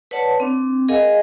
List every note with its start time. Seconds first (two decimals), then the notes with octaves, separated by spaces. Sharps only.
0.11 B4 C#5 D5 F#5 A5
0.40 C4 D4
0.88 G#4 A#4 D#5 F5 F#5 G#5